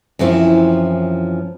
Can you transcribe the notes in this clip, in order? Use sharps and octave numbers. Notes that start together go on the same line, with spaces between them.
F#2 E3 F3 C4 C#4 E4